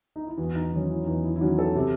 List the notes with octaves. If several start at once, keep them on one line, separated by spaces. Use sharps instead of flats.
D#4
E4
E2 F#4
D#4
D#3 F#3 C#4
E4
E2 D#4
E4
E4
D#3 F#3 C#4 F#4
A4
C3